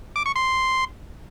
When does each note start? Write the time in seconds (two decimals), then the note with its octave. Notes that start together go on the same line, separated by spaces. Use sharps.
0.16 D6
0.26 C#6
0.36 C6